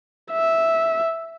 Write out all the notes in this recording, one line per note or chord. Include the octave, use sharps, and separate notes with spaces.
E5